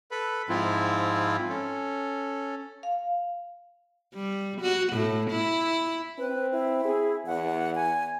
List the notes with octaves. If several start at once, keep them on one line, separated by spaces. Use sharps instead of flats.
A4 B4 B5
G#2 F3 C4 E4 F4
C#4 A4
F5
G3
F#4
A2
E4
C4 B4
E4
G#4
E2 F#5
G#5